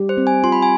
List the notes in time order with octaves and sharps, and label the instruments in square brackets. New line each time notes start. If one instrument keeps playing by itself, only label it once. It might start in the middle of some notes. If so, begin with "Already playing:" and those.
Already playing: [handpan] G3 G4
[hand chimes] C5
[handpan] C4
[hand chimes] G#5
[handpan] F4 [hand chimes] C6
[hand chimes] B5
G#5